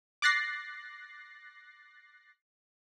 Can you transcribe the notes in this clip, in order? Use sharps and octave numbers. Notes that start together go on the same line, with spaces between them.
D6 F#6 A6 A#6 C7